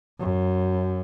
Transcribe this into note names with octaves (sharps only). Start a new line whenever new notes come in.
F#2